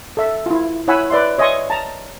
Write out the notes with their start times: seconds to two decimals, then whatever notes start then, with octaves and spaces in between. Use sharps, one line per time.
0.17 A4 E5
0.46 E4 F4
0.88 E4 C#5 F#5 G#5 B5 E6
1.10 B4 D5 E5 C6
1.38 C#5 D#5 E5 G#5 C6 C#6
1.70 A5 A#5